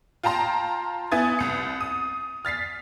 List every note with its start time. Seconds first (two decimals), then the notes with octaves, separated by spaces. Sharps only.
0.23 F4 G5 A5 A#5 C6
1.12 B3 E4 G#5 D#6 G#6 A6
1.39 C2 C#7
1.81 D#6
2.45 F6 A6 B6 C7